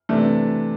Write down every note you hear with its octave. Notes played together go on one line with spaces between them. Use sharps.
C3 E3 A3 D4